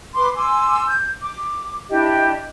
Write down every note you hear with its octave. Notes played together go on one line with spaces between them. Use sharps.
B4 C6 D6
G#5 C6 D6 E6
G6
D6
D4 E4 G4 D#5